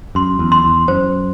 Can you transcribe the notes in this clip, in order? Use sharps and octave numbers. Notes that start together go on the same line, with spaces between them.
F#2 C6
E2
C6
E2
F#2 C5